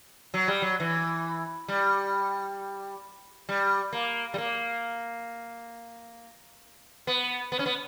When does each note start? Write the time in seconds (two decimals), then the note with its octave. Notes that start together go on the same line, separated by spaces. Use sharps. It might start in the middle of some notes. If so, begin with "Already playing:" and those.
0.34 F#3
0.48 G3
0.62 F#3
0.80 E3
1.68 G3
3.49 G3
3.93 A#3
4.34 G3
4.38 A#3
7.07 B3
7.52 B3
7.59 C#4
7.66 B3